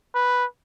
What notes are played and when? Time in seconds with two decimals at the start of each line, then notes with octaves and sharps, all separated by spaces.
0.15 B4